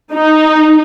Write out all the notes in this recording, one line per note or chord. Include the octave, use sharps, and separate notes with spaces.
D#4